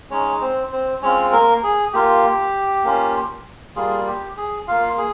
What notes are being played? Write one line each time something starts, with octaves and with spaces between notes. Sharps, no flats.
G#3 C#4 D#4 C#5
C4 C5
C4 C5
G#3 C4 C#4 F4 C#5
A#3 A#4
G#4
A#3 F4 G4
A#3 C#4 F4
G3 A#3 F4 G#4
G4
G#4
A#3 F4 F5
G#4